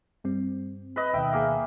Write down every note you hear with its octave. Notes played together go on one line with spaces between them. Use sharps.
G2 G3 C4
B4 D#5
D2 B2 D#3 E5 G5
A#3 G#4